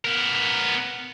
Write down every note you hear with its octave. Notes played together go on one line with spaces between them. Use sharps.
B3 A#4